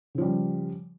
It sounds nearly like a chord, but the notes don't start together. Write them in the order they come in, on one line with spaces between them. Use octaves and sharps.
C#3 F3 G3